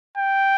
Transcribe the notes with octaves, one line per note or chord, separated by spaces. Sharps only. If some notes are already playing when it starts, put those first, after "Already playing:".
G5